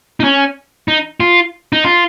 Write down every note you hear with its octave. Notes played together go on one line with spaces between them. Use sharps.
D#4
C#4
D#4
F4
D#4
F4